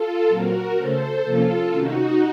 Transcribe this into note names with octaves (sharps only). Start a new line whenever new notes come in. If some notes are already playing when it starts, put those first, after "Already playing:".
Already playing: F4 A4
A#2 F#3 C4 F#4 A#4
C#3 A3 C#4 A4 C5
C3 F3 A#3 C#4 F4 A4
C3 D#3 A3 C#4 D#4 F#4